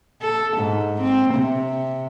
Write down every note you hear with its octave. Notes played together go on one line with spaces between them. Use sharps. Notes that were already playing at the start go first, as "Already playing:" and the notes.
A4
G#2
C4
C3